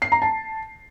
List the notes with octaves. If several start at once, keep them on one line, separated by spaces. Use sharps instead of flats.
C7
A#5
A5